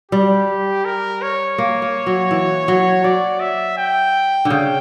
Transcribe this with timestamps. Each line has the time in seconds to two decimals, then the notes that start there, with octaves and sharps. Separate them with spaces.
0.12 G3 G4
0.85 A#4
1.22 C#5
1.58 A#3
1.82 A#3
2.06 F#3
2.31 E3
2.68 F#3
3.04 F#3 D5
3.40 E5
3.77 G5
4.45 D3
4.50 C#3 G5